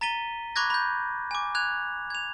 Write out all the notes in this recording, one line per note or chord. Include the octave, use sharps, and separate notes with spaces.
A#5 A6 B6 D#7 G7
B5 C#6 D6 F#6 G#6 A#6
B5 G6
G#5 D6
F#6 G#6 F7
G#6 F7